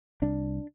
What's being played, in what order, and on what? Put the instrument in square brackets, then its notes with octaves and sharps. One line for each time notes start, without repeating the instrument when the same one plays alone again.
[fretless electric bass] C2 D4